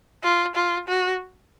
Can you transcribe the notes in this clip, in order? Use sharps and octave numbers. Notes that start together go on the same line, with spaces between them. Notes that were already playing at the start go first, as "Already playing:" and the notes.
F4
F4
F#4